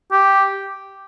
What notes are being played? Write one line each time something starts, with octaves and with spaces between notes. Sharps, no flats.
G4